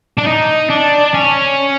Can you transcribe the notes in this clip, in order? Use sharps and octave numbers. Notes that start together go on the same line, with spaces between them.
D4
D#4
D4
C#4